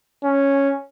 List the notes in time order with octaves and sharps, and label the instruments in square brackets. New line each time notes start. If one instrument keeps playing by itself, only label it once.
[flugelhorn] C#4